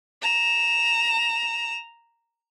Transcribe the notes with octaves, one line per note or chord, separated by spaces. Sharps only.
A#5 E7